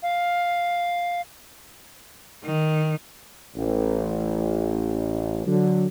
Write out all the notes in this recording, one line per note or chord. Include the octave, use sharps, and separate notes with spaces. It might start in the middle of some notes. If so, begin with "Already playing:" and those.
F5
D#3
A1
D3 F#3